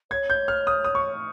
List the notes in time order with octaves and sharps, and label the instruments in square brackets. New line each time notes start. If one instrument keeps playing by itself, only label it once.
[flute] C#5 [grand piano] G#6
[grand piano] G6
F6
D#6
D#6
C#6